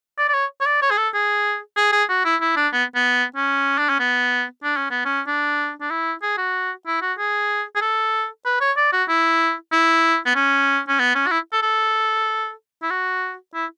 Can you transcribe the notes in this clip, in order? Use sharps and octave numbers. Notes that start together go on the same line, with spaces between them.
D5
D5
C#5
C#5
D5
C#5
G#4
A4
G#4
G#4
G#4
F#4
E4
E4
D4
B3
B3
C#4
D4
C#4
B3
D4
C#4
B3
C#4
D4
D4
E4
G#4
F#4
E4
F#4
G#4
G#4
A4
B4
C#5
D5
F#4
E4
E4
B3
C#4
C#4
B3
C#4
F#4
E4
A4
A4
E4
F#4
E4